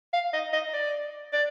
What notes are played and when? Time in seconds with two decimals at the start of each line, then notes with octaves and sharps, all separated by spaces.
0.13 F5
0.33 D#5
0.53 D#5
0.73 D5
1.33 D5